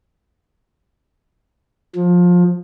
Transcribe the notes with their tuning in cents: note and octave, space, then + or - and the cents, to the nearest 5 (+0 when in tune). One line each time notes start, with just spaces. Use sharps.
F3 +20